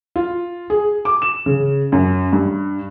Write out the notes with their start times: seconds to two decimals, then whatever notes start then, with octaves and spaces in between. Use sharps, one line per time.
0.16 F4
0.70 G#4
1.05 D6
1.22 E7
1.46 C#3
1.92 F#2
2.33 G2